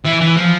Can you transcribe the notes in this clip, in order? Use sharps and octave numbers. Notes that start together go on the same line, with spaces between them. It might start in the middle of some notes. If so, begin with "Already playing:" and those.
E3
E3
F3